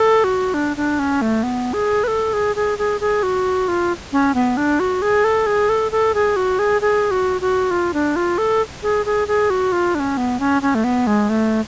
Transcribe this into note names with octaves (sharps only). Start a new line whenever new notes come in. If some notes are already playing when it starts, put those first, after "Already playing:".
Already playing: A4
F#4
D4
D4
C#4
A3
B3
G#4
B4
A4
G#4
G#4
G#4
G#4
F#4
F4
C#4
B3
D4
F#4
G#4
A4
G#4
A4
A4
G#4
F#4
G#4
G#4
F#4
F#4
F4
D4
F4
A4
G#4
G#4
G#4
F#4
F4
D4
C#4
B3
C#4
C#4
A3
B3
G#3
A3